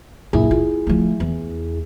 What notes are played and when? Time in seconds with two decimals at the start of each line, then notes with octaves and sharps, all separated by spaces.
0.33 A#1 F#2 E4 G#4
0.51 F4
0.87 F3 A3
1.20 E2